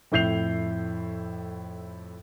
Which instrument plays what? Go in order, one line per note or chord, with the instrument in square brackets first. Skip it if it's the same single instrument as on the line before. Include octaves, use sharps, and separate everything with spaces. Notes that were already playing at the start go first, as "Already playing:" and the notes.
[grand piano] F2 A2 E4 G6 C7 F7